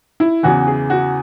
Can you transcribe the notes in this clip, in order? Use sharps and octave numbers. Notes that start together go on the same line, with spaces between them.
E4
E2 C#3 E3 F#4
G#4
F#4